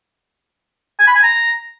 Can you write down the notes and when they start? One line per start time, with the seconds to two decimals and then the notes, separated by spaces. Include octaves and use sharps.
0.99 G#5
1.07 B5
1.15 G#5
1.23 A#5